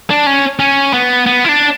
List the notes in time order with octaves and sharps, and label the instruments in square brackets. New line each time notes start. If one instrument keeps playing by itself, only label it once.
[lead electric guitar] D4
C#4
C#4
B3
B3
E4
D4